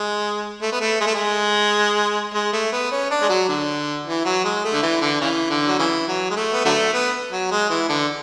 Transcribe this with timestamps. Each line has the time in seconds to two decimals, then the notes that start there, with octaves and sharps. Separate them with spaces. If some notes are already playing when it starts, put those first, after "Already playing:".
Already playing: G#3
0.62 A3
0.72 B3
0.81 A3
1.01 G#3
1.07 A3
1.15 G#3
2.34 G#3
2.53 A3
2.72 B3
2.91 C#4
3.11 D4
3.22 G#3
3.29 F#3
3.49 D3
4.06 E3
4.25 F#3
4.44 G#3
4.64 A3
4.73 D3
4.83 E3
5.01 D3
5.21 C#3 E3
5.50 D3
5.67 F#3
5.79 C#3 E3
6.08 F#3
6.30 G#3
6.36 A3
6.53 B3
6.65 D3 F#3 A3
6.93 B3
7.32 F#3
7.51 G#3
7.70 E3
7.89 D3